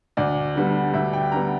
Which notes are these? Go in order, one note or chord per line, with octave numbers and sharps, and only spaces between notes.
D2 D5
D3 G3 B3
D2 E5
G5
D3 G3 B3 A#5